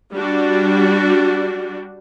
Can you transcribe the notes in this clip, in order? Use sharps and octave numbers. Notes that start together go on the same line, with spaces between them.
G3 D4 F#4